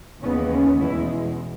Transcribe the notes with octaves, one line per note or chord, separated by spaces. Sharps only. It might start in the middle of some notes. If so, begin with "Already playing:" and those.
D#2 C#3 E3 G#3 B3 C#4
C#4
E2 B2 G#3 E4